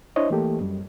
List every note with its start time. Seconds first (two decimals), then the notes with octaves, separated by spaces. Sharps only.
0.16 D4 E4 C5 C#5 D#5
0.30 E3 A3 A#3 G4 A4
0.61 F#2 G3